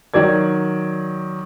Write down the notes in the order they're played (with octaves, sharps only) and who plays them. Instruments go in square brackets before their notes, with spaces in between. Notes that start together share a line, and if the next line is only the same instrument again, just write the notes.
[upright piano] D#3 F#3 D5 G#6